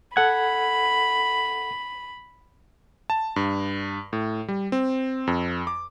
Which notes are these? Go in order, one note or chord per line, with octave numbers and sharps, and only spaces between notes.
A4 F#5 B5 G#6
A5
G2
A2
G3
C4
F2
D6